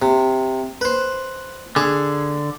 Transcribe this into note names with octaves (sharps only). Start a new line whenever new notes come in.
C3
B4 C5
D3 G#4